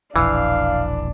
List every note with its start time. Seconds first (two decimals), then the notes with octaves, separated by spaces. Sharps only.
0.16 E1 A#1 E3 D4 F5